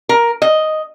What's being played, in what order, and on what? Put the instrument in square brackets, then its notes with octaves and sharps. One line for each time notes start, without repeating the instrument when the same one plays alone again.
[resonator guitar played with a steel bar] A#4
D#5